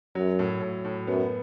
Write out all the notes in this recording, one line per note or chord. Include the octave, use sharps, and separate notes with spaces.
F#2 F#3
A2
A2
A2
F#2 B3